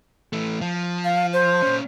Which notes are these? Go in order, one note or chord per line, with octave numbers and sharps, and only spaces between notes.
E3 A3
F3
F5
C5
A#2 C#4